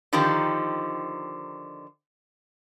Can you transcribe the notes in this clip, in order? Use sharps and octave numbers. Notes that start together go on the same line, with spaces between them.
D3 D#3 F3 D#4 G4